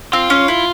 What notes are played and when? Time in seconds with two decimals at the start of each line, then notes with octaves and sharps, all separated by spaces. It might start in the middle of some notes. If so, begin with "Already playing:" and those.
0.13 C4 F4
0.30 C#4
0.48 E4